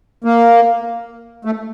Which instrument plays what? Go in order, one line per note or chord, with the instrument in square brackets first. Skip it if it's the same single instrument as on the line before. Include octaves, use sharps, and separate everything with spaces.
[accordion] A#3
A3